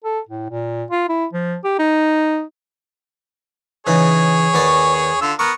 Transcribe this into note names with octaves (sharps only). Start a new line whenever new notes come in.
A4
A2
A#2
F4
E4
F3
G4
D#4
C#3 E3 D#4 G#4 C#5
D#2 B3 D5
D3 F4 E6
B3 A#4 C#6